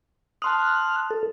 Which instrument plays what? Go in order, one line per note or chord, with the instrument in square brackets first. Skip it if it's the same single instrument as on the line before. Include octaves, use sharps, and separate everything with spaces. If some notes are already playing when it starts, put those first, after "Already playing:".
[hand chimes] A5 C6 D#6 [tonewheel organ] F6 F#6
[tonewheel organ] A4